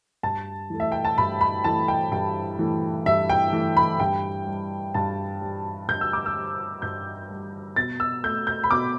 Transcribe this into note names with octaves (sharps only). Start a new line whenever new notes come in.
G2 A5
E3 A3
E5
G5
A5
G2 B5
B5
E3 A3 A5
G5
G2 G5
E3 A3
G2 E5
G5
E3 A3
B5
G2 G5
G3
G2 A5
G3
G2 G6
E6
D6
E6
G3
G2 G6
G3
B2 A6
E6
A3 G6
G6
B5
B2 D6